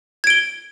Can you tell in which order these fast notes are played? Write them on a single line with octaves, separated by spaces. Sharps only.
G#6 D7 G7